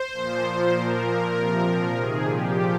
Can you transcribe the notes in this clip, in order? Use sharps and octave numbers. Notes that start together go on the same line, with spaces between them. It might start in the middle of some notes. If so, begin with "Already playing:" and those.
Already playing: C5
A#2 F3
A#2 F3
A#2 F3 A#4
A#2 F3
C3 F3
A#2 F3
C3 D#3 G#4
A#2 F3 G4